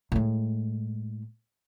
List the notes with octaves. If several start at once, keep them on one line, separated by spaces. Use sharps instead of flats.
A2 G#3